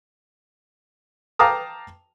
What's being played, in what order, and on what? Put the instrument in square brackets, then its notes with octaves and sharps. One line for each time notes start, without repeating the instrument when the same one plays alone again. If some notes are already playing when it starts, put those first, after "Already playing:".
[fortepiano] F5 G5 A5 A#5 D6 D#6